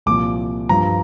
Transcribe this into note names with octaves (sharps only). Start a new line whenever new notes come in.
C2 A#2 F3 D6
G2 F3 A#5